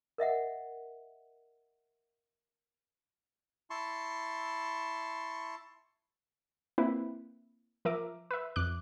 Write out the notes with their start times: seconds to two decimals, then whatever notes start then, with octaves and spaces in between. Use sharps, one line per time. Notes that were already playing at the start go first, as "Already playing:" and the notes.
0.18 A#4 D#5 E5 F#5
3.70 E4 A5 C6 C#6
6.78 A#3 C4 E4 B4
7.85 F3 A#4 E5 D6
8.31 B4 E5
8.56 F2 D6 F#6